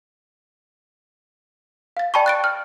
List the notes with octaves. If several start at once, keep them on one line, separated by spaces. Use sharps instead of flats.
F5 A6
D5 G5 A5 B5 C#6
F#6 A6 D7
F6